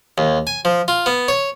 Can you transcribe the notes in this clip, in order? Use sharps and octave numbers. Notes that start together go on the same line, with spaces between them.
D#2
G#5
F3
F4
B3
C#5